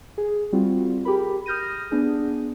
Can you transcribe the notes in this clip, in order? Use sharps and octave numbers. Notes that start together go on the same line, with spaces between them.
G#4
G3 C4 F4 F#4
G4 G#4 A#4 B5
D#6 F6 G6 A#6 D#7
B3 D4 G#4